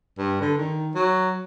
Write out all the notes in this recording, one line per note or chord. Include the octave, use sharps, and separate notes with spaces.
G2
D3
D#3
F#3